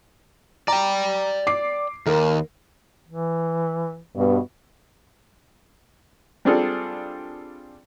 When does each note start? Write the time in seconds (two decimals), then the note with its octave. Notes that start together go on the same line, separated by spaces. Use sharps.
0.68 D5 G5 A#5
1.47 D6 C7
2.06 D#2 A#4
3.09 E3
4.16 G2 B2
6.45 G3 C4 D4 F4 G#4 A4